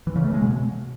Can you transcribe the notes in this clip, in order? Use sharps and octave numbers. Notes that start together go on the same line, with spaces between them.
E3
C#3
A3
G#3
B2